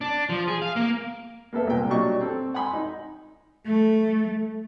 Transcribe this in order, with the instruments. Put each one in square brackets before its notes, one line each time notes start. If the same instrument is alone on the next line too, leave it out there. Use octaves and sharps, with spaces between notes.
[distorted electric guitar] D4
F3
G#4
F5
A#3
[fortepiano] A#3 B3 A4 E5
C2 A#2 G#3 G5
A#2 F#3 G3 D4 D#5 C#6
C4 A4
F#5 G#5 B5 C6
D#4
[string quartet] A3